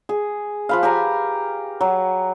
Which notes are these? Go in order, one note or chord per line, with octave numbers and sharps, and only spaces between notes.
G#4
F3 B4 F5
G4 G#5 A#5
F#3